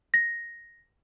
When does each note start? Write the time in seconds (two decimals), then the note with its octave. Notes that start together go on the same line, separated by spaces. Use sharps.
0.14 A#6